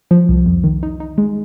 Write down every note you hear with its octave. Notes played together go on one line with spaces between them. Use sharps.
F3
C2
F2
D#3
D#4
D#4
G#3